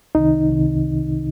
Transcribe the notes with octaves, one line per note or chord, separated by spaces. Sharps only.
C2 C3 D#3 D#4
C2 C3 D#3